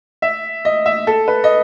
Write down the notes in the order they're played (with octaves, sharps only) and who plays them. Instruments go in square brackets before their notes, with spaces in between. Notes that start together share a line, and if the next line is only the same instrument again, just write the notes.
[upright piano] E5
D#5
E5
A4
B4
D#5